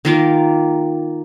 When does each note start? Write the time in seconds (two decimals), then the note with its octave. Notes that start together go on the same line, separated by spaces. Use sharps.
0.05 D#3 A#3 F4